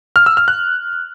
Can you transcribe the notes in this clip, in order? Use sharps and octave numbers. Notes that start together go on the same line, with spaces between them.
F6
E6
F6
F#6